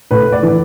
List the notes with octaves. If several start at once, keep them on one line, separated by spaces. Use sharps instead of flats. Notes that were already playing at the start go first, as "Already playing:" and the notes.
A2 B4
D5
E3